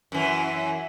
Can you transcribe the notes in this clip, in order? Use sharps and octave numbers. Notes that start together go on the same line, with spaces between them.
F#2 E3